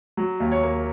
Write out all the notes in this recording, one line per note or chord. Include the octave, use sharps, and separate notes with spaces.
F#3
D#2
C#5
A#3